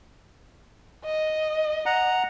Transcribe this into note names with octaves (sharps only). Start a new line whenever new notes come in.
D#5
F#5 A#5